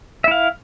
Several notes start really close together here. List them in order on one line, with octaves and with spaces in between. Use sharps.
E5 E4 F5